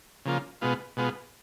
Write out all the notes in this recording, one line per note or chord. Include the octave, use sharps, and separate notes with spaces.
C#3 F3 A#3 F4
B2 G#3 B3 F4
B2 G#3 B3 F4